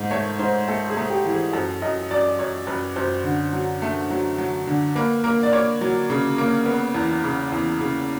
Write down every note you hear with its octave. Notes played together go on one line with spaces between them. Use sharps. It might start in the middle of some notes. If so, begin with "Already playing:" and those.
Already playing: G#2
A3 C#5
G#2 C5
A3 A4
G#4
A3
G4
E3
G#4
F#2 A4
F#2 D#5
F#2 D5
F#2 C#5
F#2 B4
F#2 C5
D3
F#3
A3
F#3
F#3
D3
A#3 B4
A#3 A#4
D5
A#3 C#5
F#3
C#3
A#3
B3
E2
C#3
E2
C#3